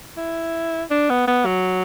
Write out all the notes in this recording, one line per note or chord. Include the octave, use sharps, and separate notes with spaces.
E4
D4
B3
B3
F#3